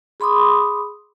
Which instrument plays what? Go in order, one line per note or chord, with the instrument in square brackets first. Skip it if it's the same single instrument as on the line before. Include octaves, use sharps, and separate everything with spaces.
[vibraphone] G#4 B5 C6 D6 D#6